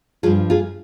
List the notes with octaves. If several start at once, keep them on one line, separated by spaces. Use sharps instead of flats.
G2 F3 F4 G#4
F4 G#4